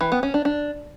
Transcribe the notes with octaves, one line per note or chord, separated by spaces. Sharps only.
E3
B3
C#4
D4
D4